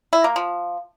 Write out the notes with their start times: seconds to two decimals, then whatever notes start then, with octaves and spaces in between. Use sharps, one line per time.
0.13 E4
0.24 A#3
0.36 F3